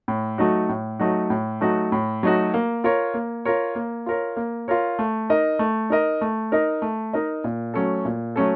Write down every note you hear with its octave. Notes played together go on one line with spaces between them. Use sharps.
A2
F#3 A3 D#4 F#4
A2
F#3 A3 D#4 F#4
A2
F#3 A3 D#4 F#4
A2
F#3 A3 D#4 F#4
A#3
F4 A#4 C#5
A#3
F4 A#4 C#5
A#3
F4 A#4 C#5
A#3
F4 A#4 C#5
A3
D#4 A#4 D#5
A3
D#4 A#4 D#5
A3
D#4 A#4 D#5
A3
D#4 A#4 D#5
A#2
F#3 A3 C#4 A4
A#2
F#3 A3 C#4 A4